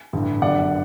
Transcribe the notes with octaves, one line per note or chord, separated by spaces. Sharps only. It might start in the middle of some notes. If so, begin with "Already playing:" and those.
A1 G2 D3
G1 F#2 D3 D5 F#5